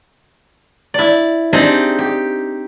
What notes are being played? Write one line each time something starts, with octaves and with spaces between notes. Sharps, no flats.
E4 D5
C4 D4 D#4 G4 G#4 D5
G4